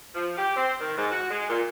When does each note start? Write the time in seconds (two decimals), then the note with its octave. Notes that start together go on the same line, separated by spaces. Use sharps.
0.14 F3
0.37 G4
0.56 C4
0.80 D#3
0.96 G#2
1.12 F#4
1.30 G#3
1.49 A#2